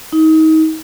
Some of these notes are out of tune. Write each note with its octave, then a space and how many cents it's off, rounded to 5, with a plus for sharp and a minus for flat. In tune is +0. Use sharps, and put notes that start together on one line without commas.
D#4 +30